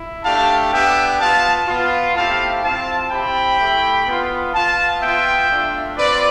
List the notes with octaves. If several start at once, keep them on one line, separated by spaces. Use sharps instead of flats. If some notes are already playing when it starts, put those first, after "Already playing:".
Already playing: E4
A3 D4 G4 F5 A5
B3 D4 G4 E5 G5
B3 F4 F5 A5
B3 F4
A3 C4 E4 G4 F5 A5
C4 F4 F5 A5
C4 E4 G4 G5 B5
A3 E4 G4
B3 F4
B3 F4 F5 A5
B3 F4 E5 G5
A3 D4 F4
C4 F4 B4 D5